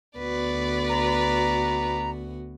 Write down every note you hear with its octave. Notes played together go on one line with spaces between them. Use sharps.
D2 B3 F#4 B4 D5
A#5